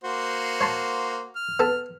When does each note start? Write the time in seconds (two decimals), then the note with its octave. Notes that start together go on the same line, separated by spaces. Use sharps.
0.04 A#3 F#4 C5
0.61 C#5 A5 C6
1.36 F6
1.60 B3 A4 A5